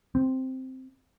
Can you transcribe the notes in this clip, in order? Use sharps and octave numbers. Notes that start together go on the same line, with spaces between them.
C4